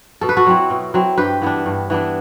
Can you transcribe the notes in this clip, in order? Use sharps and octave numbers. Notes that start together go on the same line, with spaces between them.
B2 A4
B4
F#4 A4
F#3 C4 E4
B2
F#3 C4 E4
G2 G4 B4
E3 B3 D4
G2
E3 B3 D4